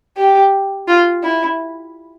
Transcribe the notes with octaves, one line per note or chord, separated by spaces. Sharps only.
G4
F4
E4